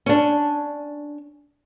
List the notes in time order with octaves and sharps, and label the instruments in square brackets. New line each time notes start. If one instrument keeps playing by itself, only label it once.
[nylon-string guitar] C#4 D4